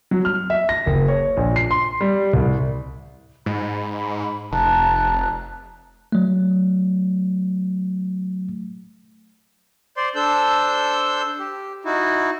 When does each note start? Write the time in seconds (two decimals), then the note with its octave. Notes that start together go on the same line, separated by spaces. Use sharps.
0.11 F#3
0.25 F6
0.50 E5
0.69 A#6
0.86 F#1
1.08 C#5
1.37 A#1
1.56 C7
1.71 C6
2.01 G3
2.33 C2
3.46 G#2 B5
4.52 F1 A5 A#5 F#6
6.12 F#3 A3
9.97 C5 D5 C6
10.15 D4 A4 C5 E6 G6
11.39 G4
11.85 D#4 E4 F#4